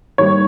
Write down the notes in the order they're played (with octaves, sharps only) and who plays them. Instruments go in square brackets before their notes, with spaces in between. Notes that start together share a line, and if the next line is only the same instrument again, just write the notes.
[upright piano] G#2 D#3 G3 A#3 C#5